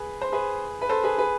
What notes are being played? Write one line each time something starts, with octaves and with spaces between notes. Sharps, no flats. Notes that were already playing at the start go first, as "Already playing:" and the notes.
Already playing: G#4 B4
C5
G#4 B4
B4
A4 C5
G#4 B4
G#4 B4